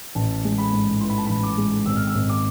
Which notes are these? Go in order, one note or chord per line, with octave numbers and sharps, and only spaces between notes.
A1 A5
G#3
B5
G#2
E3 C6
B5
A5
A1 B5
D6
G#3
G#1 E6
F6
E6
G#1
D6